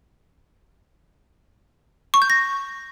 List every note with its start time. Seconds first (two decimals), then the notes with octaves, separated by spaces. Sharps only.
2.14 C#6
2.22 G6
2.30 A#6